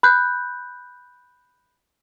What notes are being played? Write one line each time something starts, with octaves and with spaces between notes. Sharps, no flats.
B5 F#6 G6